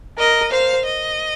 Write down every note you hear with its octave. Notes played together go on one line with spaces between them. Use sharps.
A#4 D#5
C5 F5
D#5